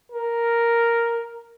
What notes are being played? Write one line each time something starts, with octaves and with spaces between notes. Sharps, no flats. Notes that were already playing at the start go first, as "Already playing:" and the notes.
A#4